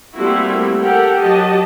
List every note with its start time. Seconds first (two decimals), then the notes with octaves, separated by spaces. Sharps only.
0.14 G3 A3 A#3 C4 E4 F#4
0.81 G4 A4 A#4 F#5 G5
1.21 F#3 F#4 G4 D#5 A5